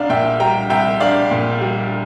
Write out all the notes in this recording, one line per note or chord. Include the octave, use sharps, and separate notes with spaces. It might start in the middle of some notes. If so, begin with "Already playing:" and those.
Already playing: C2 D4 D5 F5
A#2 E5 G5
G3 G5 A#5
C2 E5 G5
D4 D5 F5
A#2
G3